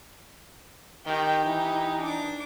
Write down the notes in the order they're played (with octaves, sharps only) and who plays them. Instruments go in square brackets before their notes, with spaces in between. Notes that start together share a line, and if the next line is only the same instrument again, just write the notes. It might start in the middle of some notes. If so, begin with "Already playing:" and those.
[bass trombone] D#3 [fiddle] G4 [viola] G5
[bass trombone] E3 [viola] D#4
[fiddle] D4 D6